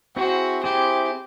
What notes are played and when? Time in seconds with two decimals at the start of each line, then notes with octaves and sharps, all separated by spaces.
0.16 C4 E4 F#4 G#4 C5
0.64 C4 E4 G4 G#4 C5